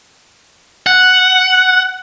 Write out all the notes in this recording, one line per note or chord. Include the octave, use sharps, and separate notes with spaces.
F#5